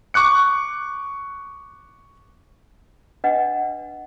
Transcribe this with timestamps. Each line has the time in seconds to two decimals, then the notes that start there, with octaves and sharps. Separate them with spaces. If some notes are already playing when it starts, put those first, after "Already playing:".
0.14 C#6 D6 F#6 C#7
3.24 D4 B4 D#5 F#5